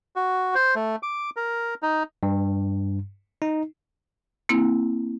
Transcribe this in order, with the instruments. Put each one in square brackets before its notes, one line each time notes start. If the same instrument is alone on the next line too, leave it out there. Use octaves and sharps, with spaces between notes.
[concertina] F#4
C5
A3
D6
A#4
D#4
[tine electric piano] G2
D#4
[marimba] A#3 C4 E4